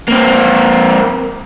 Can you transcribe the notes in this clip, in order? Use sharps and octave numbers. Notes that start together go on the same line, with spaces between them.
A#3 C4